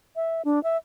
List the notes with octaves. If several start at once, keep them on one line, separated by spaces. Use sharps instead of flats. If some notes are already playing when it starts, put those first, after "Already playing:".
E5
D4
E5